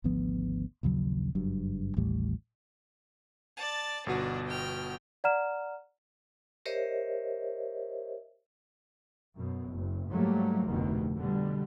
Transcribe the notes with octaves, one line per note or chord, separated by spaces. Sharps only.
G#1 D2 F3 B3
A#1 D#2 C#3 F#3
F#1 G2 F#3
A1 D#2 A2 G3
D5 A5
G1 B2 D4 D#4 F#4
G5 F6
D5 F#5 A#5 F6 E7
G4 A#4 C5 C#5 D#5 E5
F#2 B2
F#1
G#2 F#3 G3 A3 A#3
F1 D2 B2 D#3
B2 D3 G3